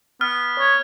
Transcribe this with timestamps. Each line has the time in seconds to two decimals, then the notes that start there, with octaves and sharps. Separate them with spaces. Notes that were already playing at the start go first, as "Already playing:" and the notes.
0.21 B3 F6
0.59 C#5